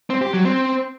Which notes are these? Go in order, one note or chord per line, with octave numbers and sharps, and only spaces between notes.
C4
G4
F#3
C4